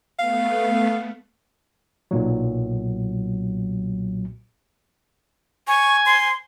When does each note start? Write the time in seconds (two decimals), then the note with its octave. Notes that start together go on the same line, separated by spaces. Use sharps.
0.19 A3 B3 F5
2.11 B1 A#2 F#3
5.68 G#5 C#6
6.06 C6